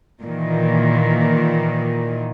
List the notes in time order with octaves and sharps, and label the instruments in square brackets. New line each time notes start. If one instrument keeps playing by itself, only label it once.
[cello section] A#2 D#3 E3